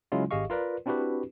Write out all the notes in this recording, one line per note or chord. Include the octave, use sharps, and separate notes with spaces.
C#3 F#3 G#3 C#4 E4 F4
G#1 G4 G#4 D#5 F5 C#6
F4 A#4 B4 D5
C4 D4 E4 F#4 G4 B4